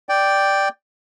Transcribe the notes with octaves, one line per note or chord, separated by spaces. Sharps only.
D5 G5